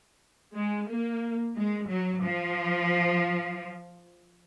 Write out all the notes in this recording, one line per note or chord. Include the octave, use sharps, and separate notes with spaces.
G#3
A#3
G#3
F#3
F3